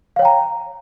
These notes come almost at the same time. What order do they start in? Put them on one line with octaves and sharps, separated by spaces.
F5 C#5 G5 A#5